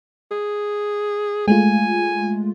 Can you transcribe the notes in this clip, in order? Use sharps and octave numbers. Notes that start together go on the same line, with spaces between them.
G#4
G#3 A3 F4 G#5